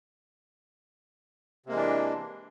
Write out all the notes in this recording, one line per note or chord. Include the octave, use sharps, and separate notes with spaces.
C3 E3 G#3 A#3 D4